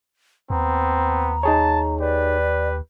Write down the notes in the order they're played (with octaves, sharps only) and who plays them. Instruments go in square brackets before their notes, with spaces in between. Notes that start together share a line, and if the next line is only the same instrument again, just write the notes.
[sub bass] D#2 [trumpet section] B3 C4 [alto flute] A#5
[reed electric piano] D#4 G#4 C#5 [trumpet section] A5
[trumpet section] G4 B4 [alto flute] D5